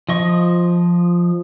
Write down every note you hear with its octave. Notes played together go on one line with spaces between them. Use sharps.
F3 D#5 C#6